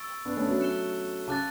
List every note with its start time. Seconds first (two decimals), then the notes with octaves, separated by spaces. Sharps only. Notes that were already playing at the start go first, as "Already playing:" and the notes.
Already playing: C#6 E6 A6 D7
0.25 B3 D4
0.37 A3 C#4
0.48 F#3 A3
0.60 F#6 C#7 E7 G7
1.27 C#3 A5 D6 F#6 A6